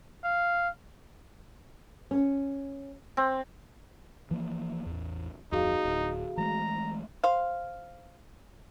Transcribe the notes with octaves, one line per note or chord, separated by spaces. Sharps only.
F5
C#4
C4
E3 F3 A#3
A1 E2
D1 F2 D#4 F#4 G#4 F5
D1
E3 G#3 A3 A#5
C5 F5